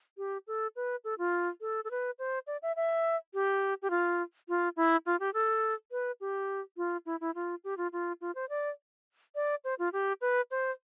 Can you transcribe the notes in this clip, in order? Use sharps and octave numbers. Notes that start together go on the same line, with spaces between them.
G4
A4
B4
A4
F4
A4
A4
B4
C5
D5
E5
E5
G4
G4
F4
F4
E4
F4
G4
A4
B4
G4
F4
E4
E4
F4
G4
F4
F4
F4
C5
D5
D5
C5
F4
G4
B4
C5